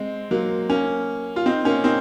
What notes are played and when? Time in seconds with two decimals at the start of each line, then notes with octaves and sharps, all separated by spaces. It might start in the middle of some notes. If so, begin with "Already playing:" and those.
Already playing: G#3 C4
0.31 F#3 A#3
0.69 A#3 C#4
1.36 F4
1.46 C4 D#4
1.65 A#3 C#4
1.84 C4 D#4